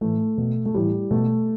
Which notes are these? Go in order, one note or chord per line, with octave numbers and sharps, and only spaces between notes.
A2 E3 A3
B2
A3
A2 E3 G3
B2 A3